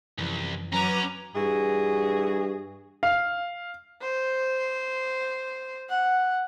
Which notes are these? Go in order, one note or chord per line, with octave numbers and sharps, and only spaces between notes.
C2 F#2 E3 F3
F#3 C#4 B4 A#5 D6
G2 E3 F#4 G#4
F5
C5
F#5